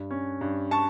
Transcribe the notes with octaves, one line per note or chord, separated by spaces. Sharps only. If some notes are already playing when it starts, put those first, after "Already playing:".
Already playing: G2
C#4
G2
A5 C#6